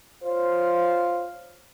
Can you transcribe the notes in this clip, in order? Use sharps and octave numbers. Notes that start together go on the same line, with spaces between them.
F4 C5 C#5 F5